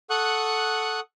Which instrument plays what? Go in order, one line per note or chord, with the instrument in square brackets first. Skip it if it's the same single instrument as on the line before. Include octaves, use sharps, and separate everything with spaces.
[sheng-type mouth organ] A4 F#5 C#6 D#6 F#6